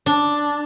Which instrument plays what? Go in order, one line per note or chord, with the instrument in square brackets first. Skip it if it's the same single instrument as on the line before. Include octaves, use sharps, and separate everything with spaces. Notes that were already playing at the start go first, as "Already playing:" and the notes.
[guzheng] D4